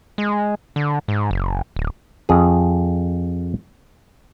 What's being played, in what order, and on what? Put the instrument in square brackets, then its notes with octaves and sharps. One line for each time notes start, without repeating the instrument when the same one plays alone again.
[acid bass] G#3
D3
G#2
F#1
D1
[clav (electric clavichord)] F2 G#4